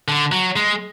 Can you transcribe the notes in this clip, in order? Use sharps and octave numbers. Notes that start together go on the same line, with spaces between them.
D3
F#3
G#3